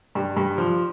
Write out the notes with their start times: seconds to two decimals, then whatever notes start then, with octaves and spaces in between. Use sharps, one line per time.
0.15 G2
0.37 G2
0.58 F3